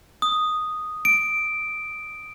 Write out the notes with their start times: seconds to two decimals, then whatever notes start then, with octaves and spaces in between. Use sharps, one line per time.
0.22 D#6
1.05 D7